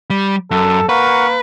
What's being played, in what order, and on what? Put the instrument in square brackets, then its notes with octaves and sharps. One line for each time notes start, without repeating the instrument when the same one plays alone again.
[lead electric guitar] G3
[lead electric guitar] F#2 [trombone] A4
[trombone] A#3 [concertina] A#4 F#5 C#6 [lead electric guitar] B4